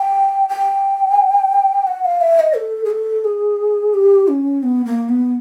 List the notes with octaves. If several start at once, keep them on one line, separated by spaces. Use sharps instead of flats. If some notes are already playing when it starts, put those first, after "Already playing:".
Already playing: G5
G5
F#5
F5
E5
D#5
A4
G#4
A4
G#4
G4
C#4
B3
A#3
B3